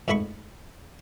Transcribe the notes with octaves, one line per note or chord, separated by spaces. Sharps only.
F2 G#2 A3 E4 B5 C#6